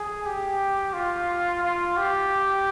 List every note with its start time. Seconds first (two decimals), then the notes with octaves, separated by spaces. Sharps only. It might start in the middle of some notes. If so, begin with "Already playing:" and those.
Already playing: G#4
0.26 G4
0.93 F4
1.63 F4
1.97 G4